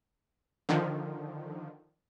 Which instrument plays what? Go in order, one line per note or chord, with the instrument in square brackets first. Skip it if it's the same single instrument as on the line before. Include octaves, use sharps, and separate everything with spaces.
[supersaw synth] D3 D#3 F3